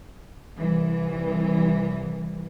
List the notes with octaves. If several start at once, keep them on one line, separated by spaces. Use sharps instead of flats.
C2 E3